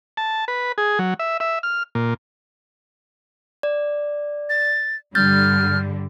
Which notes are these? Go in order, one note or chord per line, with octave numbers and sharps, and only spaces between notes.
A5
B4
G#4
F#3
E5
E5
F6
A#2
D5
A6
G2 D3 G3 F6 G6 A6